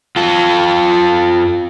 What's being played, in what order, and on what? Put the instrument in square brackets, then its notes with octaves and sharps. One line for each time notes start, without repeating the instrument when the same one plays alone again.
[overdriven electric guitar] F4 A4